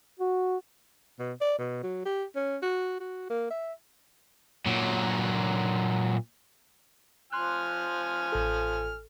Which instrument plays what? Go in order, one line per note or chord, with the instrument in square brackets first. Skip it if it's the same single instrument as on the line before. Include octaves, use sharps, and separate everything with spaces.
[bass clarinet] F#4
[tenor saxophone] B2
D5
B2
F#3
G4
C#4
F#4
F#4
A#3
E5
[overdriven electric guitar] A#2 F#3
[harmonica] F3 G#5 F6 [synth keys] C6 F#6
[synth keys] A1 A4